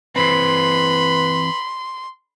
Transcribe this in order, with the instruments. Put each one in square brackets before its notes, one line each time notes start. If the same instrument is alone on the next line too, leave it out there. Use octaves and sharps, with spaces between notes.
[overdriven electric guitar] E3 C4 [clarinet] B4 [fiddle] B5 [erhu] C6